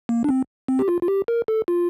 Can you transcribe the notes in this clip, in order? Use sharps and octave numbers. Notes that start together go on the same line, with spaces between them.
A#3
D4
C4
C4
G4
F4
F4
G4
A#4
A4
F4